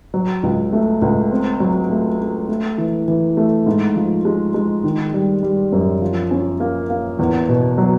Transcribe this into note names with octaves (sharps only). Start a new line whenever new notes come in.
F#3
C#2
A3
C#2
C4
F#3
A3
A3
A3
E3
E3
A3
G#2
F3
G#3
G#3
D#3
G3
G3
F#2
F3
C#4
A#3
A#3
E2
B2
F#3